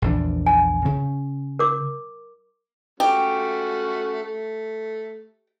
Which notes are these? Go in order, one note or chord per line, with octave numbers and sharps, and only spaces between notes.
A#1 E2 D4
G#5
C#3 C#4
A#4 D6
A3 C#4 F#4 G4
A3